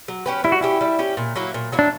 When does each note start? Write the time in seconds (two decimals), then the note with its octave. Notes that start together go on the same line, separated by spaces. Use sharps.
0.08 F#3
0.26 C#4 G4 B4
0.44 G3 E4
0.52 F#4
0.61 C#4 E4 G4
0.81 G3
0.99 C#4 G4
1.17 A#2
1.36 F#3 A#3 E4
1.54 A#2
1.72 F#3 A#3 E4
1.79 D4